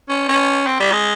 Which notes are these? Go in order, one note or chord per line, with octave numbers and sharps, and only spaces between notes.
C#4
C#4
C4
G3
G#3